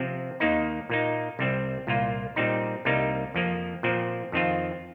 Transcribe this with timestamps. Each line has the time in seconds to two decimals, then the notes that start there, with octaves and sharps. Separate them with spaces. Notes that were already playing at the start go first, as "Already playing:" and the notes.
Already playing: C3 F3 C4
0.40 D#2 D#3 A#3 D#4
0.90 A#2 A#3 D#4
1.39 C2 C3 G3 C4
1.87 C2 A#2 A#3 F4
2.36 A#2 G3 C4 D#4
2.85 C2 C3 G3 A#3 D#4
3.35 F2 F3 A#3
3.83 A#2 F3 C4
4.32 F2 D#3 C4 F4